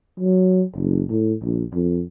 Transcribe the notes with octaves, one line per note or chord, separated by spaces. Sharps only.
F#3
F#1
A2
A#1
F2